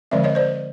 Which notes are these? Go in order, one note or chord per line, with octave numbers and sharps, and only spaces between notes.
D3 F3 G#3 C4 D5 E5
C#5 D#5
C5 D5